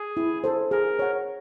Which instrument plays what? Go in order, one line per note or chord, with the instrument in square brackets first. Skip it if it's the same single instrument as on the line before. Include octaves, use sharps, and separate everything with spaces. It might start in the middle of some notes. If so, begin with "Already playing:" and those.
Already playing: [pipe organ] G#4
[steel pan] E4
A4 C5
[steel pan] G#4 [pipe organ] A#4
[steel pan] C#5 F#5